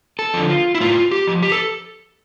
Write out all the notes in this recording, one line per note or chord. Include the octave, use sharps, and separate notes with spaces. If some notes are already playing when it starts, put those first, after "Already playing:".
A4
D3 F3
F4
E4
A2 F4
G4
F3
G4
A4